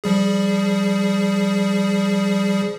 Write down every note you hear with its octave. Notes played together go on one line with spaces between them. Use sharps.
F3 G3 G#4